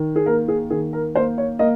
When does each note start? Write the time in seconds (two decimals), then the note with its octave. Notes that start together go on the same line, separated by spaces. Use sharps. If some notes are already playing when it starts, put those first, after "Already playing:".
Already playing: D#3
0.16 G#4
0.26 A#3 A#4
0.48 G#4
0.70 D#3 G#4
0.93 A#4
1.15 A#3 C5
1.38 C#5
1.59 A#3 D#5